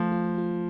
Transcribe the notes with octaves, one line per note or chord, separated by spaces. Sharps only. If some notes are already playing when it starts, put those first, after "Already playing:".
Already playing: F3 A3
F4
F4